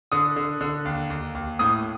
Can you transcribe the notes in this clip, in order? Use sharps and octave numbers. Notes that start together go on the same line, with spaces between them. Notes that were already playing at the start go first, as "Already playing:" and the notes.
D3 D#6
D3
D3
D#2
D#2
D#2
A2 D#6